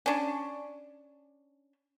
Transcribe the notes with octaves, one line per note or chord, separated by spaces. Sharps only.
C#4 D4